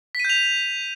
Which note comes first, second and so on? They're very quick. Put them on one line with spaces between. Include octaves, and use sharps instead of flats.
B6 D#7 G6 F7